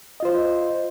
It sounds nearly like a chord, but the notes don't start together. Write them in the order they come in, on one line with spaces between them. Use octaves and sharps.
D#5 F4 C5